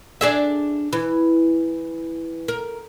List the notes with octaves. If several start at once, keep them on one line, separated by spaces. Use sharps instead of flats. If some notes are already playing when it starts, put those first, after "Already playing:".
D4 G#4 E5
E3
A#4